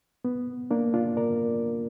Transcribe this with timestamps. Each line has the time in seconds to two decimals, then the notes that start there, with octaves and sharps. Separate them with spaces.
0.25 B3
0.71 A#3 D4
0.94 D4 F4
1.17 A#4 D5